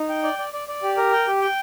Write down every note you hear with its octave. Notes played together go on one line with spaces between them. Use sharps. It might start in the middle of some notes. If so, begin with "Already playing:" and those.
Already playing: D#4
G5
D5
D5
D5
D5
G4
A#4
G5
G4
G5